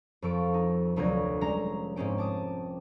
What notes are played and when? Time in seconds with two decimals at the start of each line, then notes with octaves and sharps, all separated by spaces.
0.22 F2 F3 A4 C#6 D7
0.54 D#4
0.96 F1 D2 F#3 G4 C#6 G#6
1.41 G3 G#3 C#4 A#5 A#6
1.96 G#2 G#3 C4 C#4 G5
2.18 A5 D6 D#6